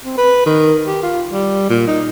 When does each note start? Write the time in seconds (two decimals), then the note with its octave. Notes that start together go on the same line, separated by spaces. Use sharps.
0.04 C4
0.17 B4
0.46 D#3
0.87 G4
1.03 F4
1.32 G3
1.69 A#2
1.87 D#4